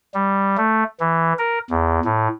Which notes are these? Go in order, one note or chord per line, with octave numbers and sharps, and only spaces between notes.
G3
A3
E3
A#4
E2
A2